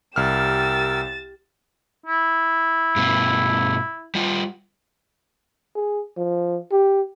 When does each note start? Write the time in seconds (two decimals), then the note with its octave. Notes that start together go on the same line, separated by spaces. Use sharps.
0.16 C2 G4 A#4 E6 F6 A6 E7
2.06 E4
2.96 G2 B2
4.15 G3 F4
5.75 G#4
6.17 F3
6.71 G4